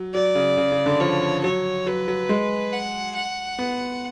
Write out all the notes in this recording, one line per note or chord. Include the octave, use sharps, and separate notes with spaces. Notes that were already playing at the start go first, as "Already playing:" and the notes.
Already playing: F#3
F#3 D5
C#3
C#3
C#3
D3
F3 C#5
F#3 C#5
F#3 B4
F#3
G#3
F#5
F#5
B3